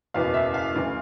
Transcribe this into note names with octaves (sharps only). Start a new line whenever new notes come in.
F#1 E2 B2 F5
E5
F5
D2 C#3 E3